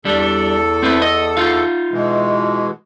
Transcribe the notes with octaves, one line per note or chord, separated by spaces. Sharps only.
E2 G3 D4 A4
C4 E4 B4
D#5
D#4 F4 F5
B2 E3 G#3